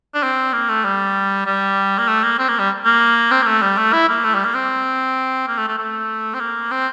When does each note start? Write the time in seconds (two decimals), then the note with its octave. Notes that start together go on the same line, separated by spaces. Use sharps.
0.14 D4
0.23 C4
0.53 A#3
0.69 A3
0.85 G3
1.46 G3
1.99 A#3
2.08 A3
2.23 A#3
2.39 C4
2.49 A#3
2.59 G3
2.85 A#3
3.31 C4
3.43 A#3
3.46 A3
3.62 G3
3.77 A3
3.93 E4
4.09 A#3
4.24 A3
4.34 G3
4.45 A#3
4.55 C4
5.48 A#3
5.57 A3
5.68 A3
5.78 A3
6.34 C4
6.40 A#3
6.71 C4